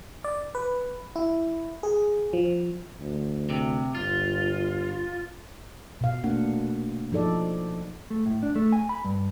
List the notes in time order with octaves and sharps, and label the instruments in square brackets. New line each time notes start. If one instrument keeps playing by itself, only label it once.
[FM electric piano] D5
B4
E4
G#4
F3
[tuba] D2
[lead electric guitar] C3
[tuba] G1 [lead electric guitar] F4
[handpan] B2 F5
A3 A#3 D4 F#5
F3 D#4 A4 D5
[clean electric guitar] A3
A2
D4
A3
G#5
B5
G2